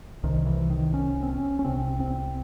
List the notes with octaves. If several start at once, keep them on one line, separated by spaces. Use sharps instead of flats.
C2 C3 D#3
E3
D#3
C#4
C4
C#4
C#4
C2 C3 C4
C4